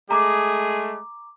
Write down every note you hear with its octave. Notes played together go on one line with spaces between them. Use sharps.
G#3 A3 G#4 A#5 D6